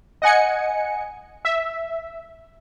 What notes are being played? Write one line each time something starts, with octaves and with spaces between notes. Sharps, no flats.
D#5 F#5 G#5 C#7
E5